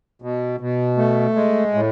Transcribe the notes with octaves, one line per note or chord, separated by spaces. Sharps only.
B2
B2
A3
G#3
A2